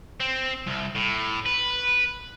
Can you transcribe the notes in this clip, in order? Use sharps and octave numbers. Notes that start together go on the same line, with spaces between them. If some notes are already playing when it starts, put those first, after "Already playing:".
C4
C2
A2
B4